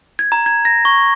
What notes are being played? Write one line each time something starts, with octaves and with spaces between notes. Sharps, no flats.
G#6
A#5
G#6
A#6
C#6